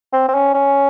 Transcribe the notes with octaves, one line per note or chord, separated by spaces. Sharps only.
C4
C4
C#4
C#4